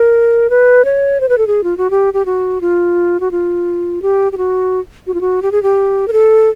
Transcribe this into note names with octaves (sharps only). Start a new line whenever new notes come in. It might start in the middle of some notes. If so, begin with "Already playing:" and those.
Already playing: A#4
B4
C#5
C5
B4
A4
G#4
F4
F#4
G4
G4
F#4
F4
F#4
F4
G4
G4
F#4
F#4
F4
F#4
G4
G#4
G4
A#4
A4